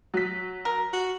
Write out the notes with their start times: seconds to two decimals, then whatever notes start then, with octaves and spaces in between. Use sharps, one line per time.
0.14 F#3 B6
0.65 A#4
0.93 F#4